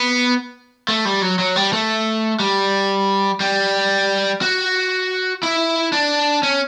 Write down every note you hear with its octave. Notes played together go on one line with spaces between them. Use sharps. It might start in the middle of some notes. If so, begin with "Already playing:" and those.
Already playing: B3
A3
G3
F#3
F#3
G3
A3
G3
G3
F#4
E4
D4
C#4